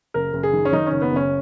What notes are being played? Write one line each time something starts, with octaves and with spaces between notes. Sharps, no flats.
F#1 A#4
F#1
G#4
D#3
C#4
D#3 D#4
C#4
F#1
B3
F#1 C#4